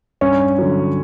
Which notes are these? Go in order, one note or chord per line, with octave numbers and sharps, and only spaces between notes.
G2 C#4
D3 F#3